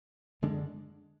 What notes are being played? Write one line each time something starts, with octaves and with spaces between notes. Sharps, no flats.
F#2 D3 G#3 D4